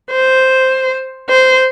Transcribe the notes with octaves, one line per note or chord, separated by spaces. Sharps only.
C5
C5